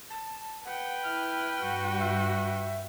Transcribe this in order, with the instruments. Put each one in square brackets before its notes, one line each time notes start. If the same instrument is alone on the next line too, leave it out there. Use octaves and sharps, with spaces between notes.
[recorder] A5
[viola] B4 G5 [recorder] F#5
[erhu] E4 [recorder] F6
[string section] G2 [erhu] F#4
[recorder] E5